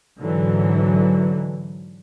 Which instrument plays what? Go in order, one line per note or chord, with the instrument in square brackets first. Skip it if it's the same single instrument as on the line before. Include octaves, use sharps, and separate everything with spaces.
[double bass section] G#2 D3 E3 F#3